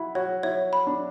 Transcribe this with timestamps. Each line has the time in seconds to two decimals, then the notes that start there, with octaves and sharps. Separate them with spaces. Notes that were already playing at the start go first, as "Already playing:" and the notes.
Already playing: E4 F#4 B5
0.15 F#4 C#5
0.43 E4 C#5
0.73 B5
0.87 D4